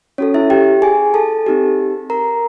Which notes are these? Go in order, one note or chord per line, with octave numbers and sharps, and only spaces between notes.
C#4 F#4 A4 C#5
E4 E5
G4 G5
G#4 G#5
A4 A5
C4 D#4 G4
A#4 A#5